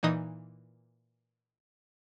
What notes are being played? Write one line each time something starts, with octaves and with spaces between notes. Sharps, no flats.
A#2 E3 D#4 D#6